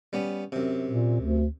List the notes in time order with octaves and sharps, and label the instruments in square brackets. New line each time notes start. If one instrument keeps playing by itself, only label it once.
[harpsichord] G3 B3 C#4
F#2 C3
[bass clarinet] A#2
D2